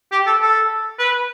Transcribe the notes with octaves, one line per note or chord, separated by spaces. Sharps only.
G4
A4
A4
B4